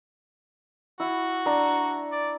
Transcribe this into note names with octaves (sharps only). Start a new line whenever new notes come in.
E4 F#4
D4 A#5
D5